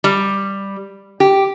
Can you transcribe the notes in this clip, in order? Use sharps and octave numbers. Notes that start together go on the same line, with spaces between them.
G3
G4